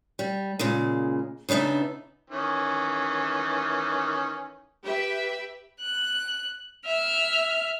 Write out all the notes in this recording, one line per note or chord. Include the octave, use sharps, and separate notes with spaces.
G3
A#2 C#3 G#3
C#3 B3 D4 D#4 E5
D#3 E3 C#4
G4 B4 E5
F#6
E5 F6